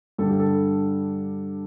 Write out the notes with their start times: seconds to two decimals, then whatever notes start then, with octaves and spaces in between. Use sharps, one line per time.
0.18 G2 D3 G3 A4
0.29 G4
0.40 A4